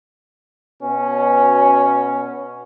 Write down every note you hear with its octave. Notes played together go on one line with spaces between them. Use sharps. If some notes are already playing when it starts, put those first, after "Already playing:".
B2 C#4